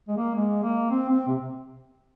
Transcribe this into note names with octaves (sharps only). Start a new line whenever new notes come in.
G#3
A#3
G#3
A#3
C4
C4
C3